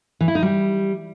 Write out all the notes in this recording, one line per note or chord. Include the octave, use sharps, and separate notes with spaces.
E3
E4
D#4
G3